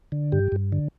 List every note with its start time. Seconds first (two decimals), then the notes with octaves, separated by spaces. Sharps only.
0.12 D3
0.32 G2 G4
0.52 G2
0.72 D3